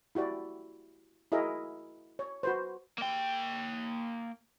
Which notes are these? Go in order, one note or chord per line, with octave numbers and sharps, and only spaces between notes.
E4 F#4 G4 D5
E4 F#4 G#4 A#4 D#5 E5
C#5
F#4 B4 C5
A#3 G5